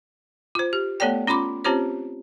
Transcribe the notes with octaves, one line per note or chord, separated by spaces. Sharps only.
F4 C5
G4
A3 B3 A4 C#5 D5 G5
C#4 F4 B5 C6 D6
C4 C#4 F4 G4 C5 C#5